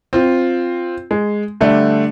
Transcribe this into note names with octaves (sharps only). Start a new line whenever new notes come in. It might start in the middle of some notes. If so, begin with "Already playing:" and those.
C4 F4
G#3
D3 G3 A3